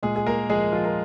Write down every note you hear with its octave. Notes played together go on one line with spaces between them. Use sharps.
A#2 G#3 G#4
G#4
A#3 A#4
F3 G#3 G#4
F3 F4
A#4